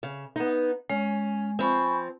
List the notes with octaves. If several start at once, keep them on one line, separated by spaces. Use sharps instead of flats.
C#3
B3 D#4
G#3 C#4
F3 C4 G#5 B5 C#6